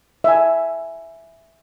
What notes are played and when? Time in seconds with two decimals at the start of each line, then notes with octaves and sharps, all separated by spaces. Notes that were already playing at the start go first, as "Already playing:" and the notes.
0.24 E5 G#5